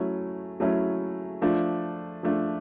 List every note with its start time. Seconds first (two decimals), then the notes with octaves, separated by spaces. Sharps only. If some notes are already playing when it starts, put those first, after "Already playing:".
Already playing: F#3 A3 C#4 E4
0.60 F#3 A3 C#4 E4
1.42 F3 A3 D4
2.23 F3 A3 D4